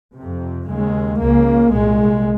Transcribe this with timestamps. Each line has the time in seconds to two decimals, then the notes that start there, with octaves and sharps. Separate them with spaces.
0.15 C3
0.21 F2
0.68 D#2 C#3 G#3
1.20 C#2 C#3 A#3
1.72 C2 A#2 G#3